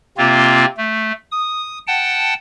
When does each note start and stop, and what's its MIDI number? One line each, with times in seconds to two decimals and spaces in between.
0.18 0.65 48
0.18 0.65 58
0.18 0.65 60
0.18 0.65 65
0.77 1.12 57
1.32 1.78 87
1.87 2.34 78
1.87 2.34 79
1.87 2.34 81